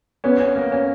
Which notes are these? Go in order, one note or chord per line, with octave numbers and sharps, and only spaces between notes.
B3 C#4
C#4
A#3
C#4